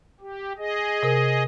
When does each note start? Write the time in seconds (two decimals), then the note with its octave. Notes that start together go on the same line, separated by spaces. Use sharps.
0.20 G4
0.58 G#4 D#5
1.03 C3 A#4